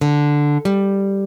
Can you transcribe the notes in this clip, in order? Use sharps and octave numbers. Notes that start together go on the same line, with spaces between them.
D3
G3